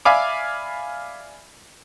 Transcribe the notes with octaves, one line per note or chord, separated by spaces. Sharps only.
D5 E5 F5 G#5 B5 D6